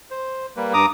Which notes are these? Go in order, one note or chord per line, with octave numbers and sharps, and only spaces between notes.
C5
G3 A#3 B4
G2 A#5 D6 D#6